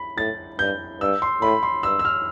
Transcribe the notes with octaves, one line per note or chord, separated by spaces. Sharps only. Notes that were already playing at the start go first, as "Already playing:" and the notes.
Already playing: B5
A2 A6
G2 G6
G2 E6
C6
A2 B5
C6
G2 E6
E6
F6